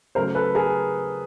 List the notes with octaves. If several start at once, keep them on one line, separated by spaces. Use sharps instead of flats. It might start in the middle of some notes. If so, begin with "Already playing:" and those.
C#3 F#3 A3 A#4 C5
A4 B4
G#4 A#4